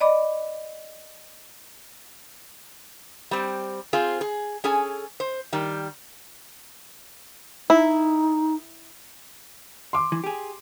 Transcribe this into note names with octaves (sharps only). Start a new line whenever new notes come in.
D5 D#5 B5 D6
G3 C4
C4 F4 G#4 C5
G#4
C#4 G#4 A4 G#5
C5
D#3 G3
D#4 E4
C6 D6
E3
G4 G#4